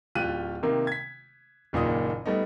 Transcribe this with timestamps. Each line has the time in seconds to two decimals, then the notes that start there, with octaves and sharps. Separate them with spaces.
0.15 D1 F4 G4 F#6 D#7
0.63 C3 D#3 A#3
0.87 G#6 B6
1.73 F#1 A#2 D#3 A#3 D#6
2.26 G3 A3 B3 D#4